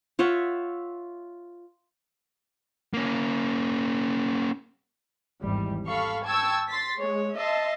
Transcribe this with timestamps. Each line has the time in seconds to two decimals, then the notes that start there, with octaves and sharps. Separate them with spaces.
0.19 F4 C#5 E5 F#5
2.94 A#3 C#4
5.42 G#1 E2 G3
5.87 A4 F5 B5 C#6
6.25 G5 A5 C#6 E6 G#6
6.70 C6 A6 B6
6.98 G#3 C#5
7.37 D#5 E5 A5 C6